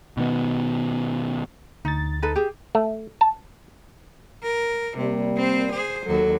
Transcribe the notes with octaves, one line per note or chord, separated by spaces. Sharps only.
B2 D#3 B3
D2 D#4 A6
D#4 A4 B4
G4 G#4
A3
A5
A#4
C3 G3 A#3
C4 C5
G#4 C5
D#2 F#3 A4